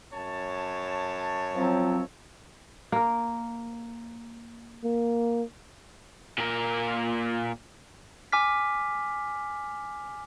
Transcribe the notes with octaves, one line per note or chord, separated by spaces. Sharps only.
F#2 C#5 A5
F3 F#3 C4
A#3 A#4
A#3
A#2 A#4
G#5 D6 F6 B6